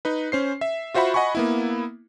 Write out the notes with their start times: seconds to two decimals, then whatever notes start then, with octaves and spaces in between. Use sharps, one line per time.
0.05 D#4 B4
0.32 C#4 C5 C7
0.61 E5
0.94 F4 F#4 C5 E5 F#5 B5
1.14 D#5 F#5 G#5 B5 C#6
1.35 A#3 B3 E4